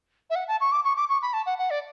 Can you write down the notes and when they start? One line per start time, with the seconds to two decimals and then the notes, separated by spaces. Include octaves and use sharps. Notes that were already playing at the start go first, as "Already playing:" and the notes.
0.30 E5
0.35 F#5
0.48 A5
0.61 C#6
0.72 D6
0.85 C#6
0.97 D6
1.09 C#6
1.22 B5
1.33 A5
1.46 F#5
1.59 F#5
1.70 D5